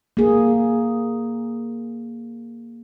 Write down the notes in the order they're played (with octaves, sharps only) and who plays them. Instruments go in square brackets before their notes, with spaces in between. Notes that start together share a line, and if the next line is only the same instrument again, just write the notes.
[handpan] A#3 G#4